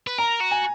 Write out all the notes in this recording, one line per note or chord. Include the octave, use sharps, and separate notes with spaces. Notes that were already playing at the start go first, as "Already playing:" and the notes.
B4
A#4 A#5
F#4
G#5